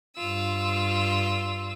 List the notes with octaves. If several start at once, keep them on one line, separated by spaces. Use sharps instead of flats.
G2 F4 E6